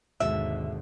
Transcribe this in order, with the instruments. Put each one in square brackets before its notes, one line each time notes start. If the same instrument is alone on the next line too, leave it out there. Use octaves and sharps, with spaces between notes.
[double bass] G#1 D#2 [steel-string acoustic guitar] B2 D3 G#3 [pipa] E5